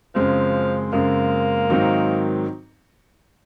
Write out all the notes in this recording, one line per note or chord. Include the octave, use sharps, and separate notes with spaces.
F#2 C#3 F3 G#3 C4
F#2 C#3 G#3 A#3 C4
G#2 D#3 F#3 C4 D#4